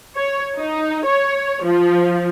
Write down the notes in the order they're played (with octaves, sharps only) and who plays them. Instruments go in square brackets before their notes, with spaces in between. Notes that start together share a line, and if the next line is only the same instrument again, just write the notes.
[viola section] C#5
D#4
C#5
F3